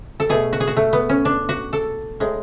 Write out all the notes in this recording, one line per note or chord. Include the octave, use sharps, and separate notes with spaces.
A4
B2 A3 G#4
F#4
G#4
F#4
A3
B3
C#4
D4
F#4
A4
A2 G#3